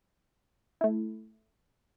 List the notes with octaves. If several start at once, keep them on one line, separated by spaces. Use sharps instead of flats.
A3 E4